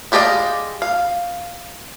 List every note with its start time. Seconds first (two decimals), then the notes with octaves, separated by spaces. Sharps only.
0.12 G#3 G4 D5 D#5 F5
0.82 F5